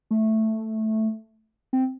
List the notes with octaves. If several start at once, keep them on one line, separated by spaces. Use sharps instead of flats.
A3
C4